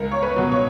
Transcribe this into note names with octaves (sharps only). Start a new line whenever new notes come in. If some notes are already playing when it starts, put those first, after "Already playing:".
Already playing: C#2 A#4
C#5
B4
B2 F#3
C#5